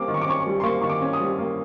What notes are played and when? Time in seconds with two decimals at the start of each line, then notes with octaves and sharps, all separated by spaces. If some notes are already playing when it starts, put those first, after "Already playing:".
Already playing: G3 A#3 C#4 D6
0.08 D#3
0.14 C#6
0.21 D6
0.28 C#4 C#6
0.40 C#6
0.46 G3
0.60 C6
0.64 A#3 C#6
0.81 D#3 C#6
0.89 D6
1.02 C#4
1.13 D#6
1.20 G3
1.39 A#3